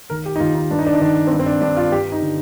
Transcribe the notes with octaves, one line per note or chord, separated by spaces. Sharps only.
D#3 A#4
G4
D#4
D#2 F4
D#4
G2 D4
D#4
D4
D#4
D#3 D4
C4
G2 D4
C4
D4
G2 D4
F4
G2 G4
D#4
D3